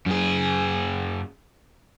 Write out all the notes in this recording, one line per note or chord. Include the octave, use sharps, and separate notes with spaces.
F#2 G#4